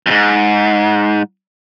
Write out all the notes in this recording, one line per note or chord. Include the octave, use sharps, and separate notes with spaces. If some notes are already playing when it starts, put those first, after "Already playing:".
F2 G#2